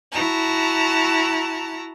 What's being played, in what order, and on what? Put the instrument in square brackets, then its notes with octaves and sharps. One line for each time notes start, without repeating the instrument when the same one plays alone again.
[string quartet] E4 F#4 A5 A#5